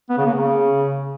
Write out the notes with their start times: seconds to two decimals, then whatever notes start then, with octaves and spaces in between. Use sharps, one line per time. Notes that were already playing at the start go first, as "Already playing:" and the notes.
0.10 B3
0.18 C#3
0.26 A#3
0.34 C#3